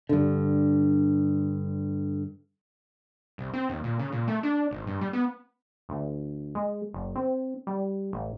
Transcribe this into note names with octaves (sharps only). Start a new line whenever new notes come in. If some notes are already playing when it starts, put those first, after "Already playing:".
G2 D3
C2
C4
D#2
A#2
C#3
A#2
A3
D4
G#1
G2
G3
B3
D2
G#3
F#1
C4
G3
A1